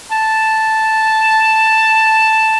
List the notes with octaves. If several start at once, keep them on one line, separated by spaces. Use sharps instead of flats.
A5